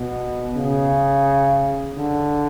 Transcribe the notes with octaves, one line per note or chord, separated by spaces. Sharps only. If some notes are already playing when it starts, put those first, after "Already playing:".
Already playing: B2
C#3
D3